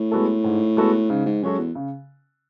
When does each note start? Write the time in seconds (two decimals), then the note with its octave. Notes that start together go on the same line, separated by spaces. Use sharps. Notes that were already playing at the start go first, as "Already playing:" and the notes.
Already playing: A2
0.11 G#3 B3 F#4 A4
0.44 G#2
0.77 G#3 B3 F#4 A4
1.10 G#2 C#3
1.26 G#2
1.43 F#2 G#3 C#4 F#4 A4
1.59 E2
1.75 C#3